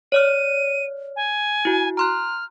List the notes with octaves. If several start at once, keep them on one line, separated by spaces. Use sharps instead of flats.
C#5 D5 F6 D#7
G#5
E4 F#4
A#5 C6 F6 F#6